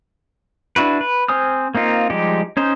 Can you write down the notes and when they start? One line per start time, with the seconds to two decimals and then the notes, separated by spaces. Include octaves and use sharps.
0.76 D4 E4 F#4 B4
1.01 B4
1.28 C4 C5 G#5 D#6 F6
1.75 A#3 C4 D#4 F4
2.10 F3 G3 G#3 D#4 G4
2.57 C#4 D#4 C5